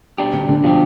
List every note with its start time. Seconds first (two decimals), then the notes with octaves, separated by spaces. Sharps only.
0.18 B2 G3 D4 G4
0.33 D3
0.49 D3
0.64 B2 F3 G3 D4 G4